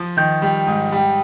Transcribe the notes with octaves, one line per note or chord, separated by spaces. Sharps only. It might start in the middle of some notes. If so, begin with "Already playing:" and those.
Already playing: F3
D#3 G6
G3
G#2
G3